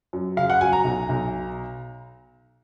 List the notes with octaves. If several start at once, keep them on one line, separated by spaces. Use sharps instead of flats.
F#2
C#3 F5
F#5
F#3 G#5
A#5
B1
B1